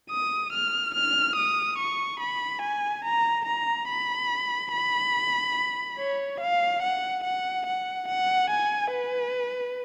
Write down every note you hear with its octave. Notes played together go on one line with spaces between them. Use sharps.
D#6
F6
F6
D#6
C#6
B5
G#5
A#5
A#5
B5
B5
C#5
F5
F#5
F#5
F#5
F#5
G#5
B4